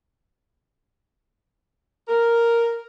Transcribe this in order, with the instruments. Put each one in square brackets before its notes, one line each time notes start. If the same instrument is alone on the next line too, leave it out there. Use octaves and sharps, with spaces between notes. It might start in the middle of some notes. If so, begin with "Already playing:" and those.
[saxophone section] A#4